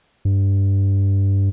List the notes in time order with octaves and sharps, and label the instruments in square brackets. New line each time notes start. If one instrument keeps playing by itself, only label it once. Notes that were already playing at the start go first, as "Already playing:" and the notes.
[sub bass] G2